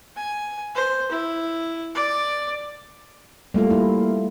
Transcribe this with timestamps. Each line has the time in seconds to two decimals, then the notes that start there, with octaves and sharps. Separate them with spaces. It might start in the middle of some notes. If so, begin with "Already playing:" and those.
0.16 G#5
0.75 C5
1.11 E4
1.95 D5
3.54 G3 A3 A#3 F4
3.71 E4